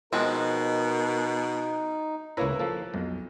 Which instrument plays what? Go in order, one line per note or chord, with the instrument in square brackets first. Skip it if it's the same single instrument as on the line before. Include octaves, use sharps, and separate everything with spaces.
[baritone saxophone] B2 [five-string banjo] F3 G#3 C4 [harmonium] D#4 [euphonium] A#4
[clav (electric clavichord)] C#2 A#3 A#5 [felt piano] E4 B4 C#5
[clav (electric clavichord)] F3 A#3 A4
[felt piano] B1 [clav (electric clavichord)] F2